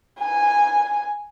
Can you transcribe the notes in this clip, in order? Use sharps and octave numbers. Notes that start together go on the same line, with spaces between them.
G#5